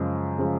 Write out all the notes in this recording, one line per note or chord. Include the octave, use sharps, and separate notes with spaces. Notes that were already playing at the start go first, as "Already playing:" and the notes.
Already playing: F#2 C#3 F3 G#3
C#3 F3 G#3